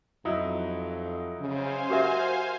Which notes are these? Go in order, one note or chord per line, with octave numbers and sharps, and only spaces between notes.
F2 F#3 D#4 E4
C#3 C5 F5 G#5
F#4 G4 A#4 E5